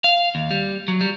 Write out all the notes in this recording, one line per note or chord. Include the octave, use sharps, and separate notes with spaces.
F5
D#2
G3
F#3
G3